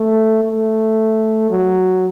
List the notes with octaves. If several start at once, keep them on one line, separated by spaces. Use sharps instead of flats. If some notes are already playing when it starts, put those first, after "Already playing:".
Already playing: A3
A3
F#3